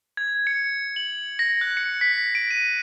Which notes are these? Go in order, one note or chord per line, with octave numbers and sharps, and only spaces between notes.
G#6
C#7
F#7
A#6
F#6
C#7
B6
D7
D#7